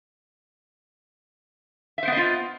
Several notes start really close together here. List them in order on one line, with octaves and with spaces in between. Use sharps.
E5 C5 B3 D#5 F4